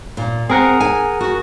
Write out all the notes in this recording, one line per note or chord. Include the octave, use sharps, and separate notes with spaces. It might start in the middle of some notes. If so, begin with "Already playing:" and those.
A#2
C4 G#4 A#4 F#5
G#5
F#4